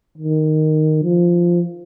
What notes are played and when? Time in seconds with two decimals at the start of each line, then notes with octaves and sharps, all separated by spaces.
0.18 D#3
1.03 F3